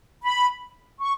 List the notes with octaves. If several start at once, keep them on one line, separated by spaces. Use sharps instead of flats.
B5
C#6